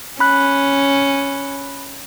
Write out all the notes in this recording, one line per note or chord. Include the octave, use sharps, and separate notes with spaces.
C#4 B5 F#6